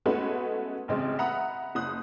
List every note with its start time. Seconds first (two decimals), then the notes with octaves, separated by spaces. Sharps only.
0.06 G#3 A3 B3 C#4 F#4 B4
0.88 A1 C#3 G#3 C4
1.18 E5 F#5 A#5 B5 D#6
1.75 F#1 D#6 F#6